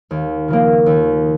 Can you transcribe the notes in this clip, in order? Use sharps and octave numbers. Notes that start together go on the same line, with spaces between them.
D#2
C#3 F3 A#3
D#2